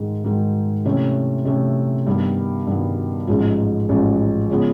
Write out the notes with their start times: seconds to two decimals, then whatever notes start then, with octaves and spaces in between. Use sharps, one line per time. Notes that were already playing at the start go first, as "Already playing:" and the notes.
Already playing: G#2 D#3 G#3
0.24 G#2 D#3 G#3
0.85 C3 E3 A3 C#4
1.45 C3 E3 A3 C#4
2.07 G2 D#3 G3 B3
2.67 G2 D#3 G3 B3
3.27 A1 G#2 F3 G#3
3.89 A1 G#2 F3 G#3
4.50 C#3 F3 G#3 B3